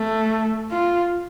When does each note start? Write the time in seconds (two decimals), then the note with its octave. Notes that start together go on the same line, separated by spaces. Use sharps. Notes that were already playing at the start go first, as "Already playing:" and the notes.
Already playing: A3
0.72 F4